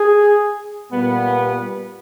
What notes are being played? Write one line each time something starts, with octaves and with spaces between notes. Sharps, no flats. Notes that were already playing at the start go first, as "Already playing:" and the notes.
Already playing: G#4
A#2 G3 B3